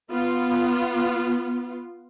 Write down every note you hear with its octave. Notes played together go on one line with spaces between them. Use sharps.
B3 F4